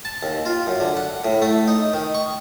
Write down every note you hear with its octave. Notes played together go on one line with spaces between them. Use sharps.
A5
D#2
F4
F#2
D3
F#5
A2
A3
D#4
D#3
C#6